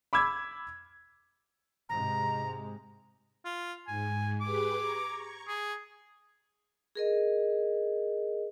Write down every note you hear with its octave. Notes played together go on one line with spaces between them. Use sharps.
B5 D6 E6 G#6
G#2 C3 G#3 A#5
F4
G#2 G#5
G4 G#4 B4 D6
A#5 C#6 G#6
G#4
G#4 A#4 D#5